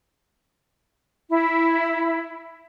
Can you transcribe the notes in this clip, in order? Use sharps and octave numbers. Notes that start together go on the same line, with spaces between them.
E4